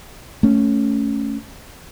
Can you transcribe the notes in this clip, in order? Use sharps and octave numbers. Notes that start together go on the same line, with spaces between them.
A3 C#4